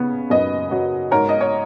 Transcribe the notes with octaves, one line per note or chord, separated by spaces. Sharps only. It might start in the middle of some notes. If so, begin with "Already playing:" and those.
Already playing: C#3 B3
F#2 B4 D#5
F#3
G#2 A#4 C#5
D#5
C#5